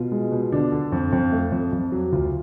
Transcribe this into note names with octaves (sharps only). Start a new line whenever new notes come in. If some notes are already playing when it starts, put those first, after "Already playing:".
Already playing: B2 F4
G#3
B2
D3 D4
D3
F2
F2
A3
F2
F2
F#3
D2 F4